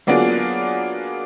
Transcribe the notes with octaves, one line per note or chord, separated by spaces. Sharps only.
F#3 A#3 B3 D4 F4 G#4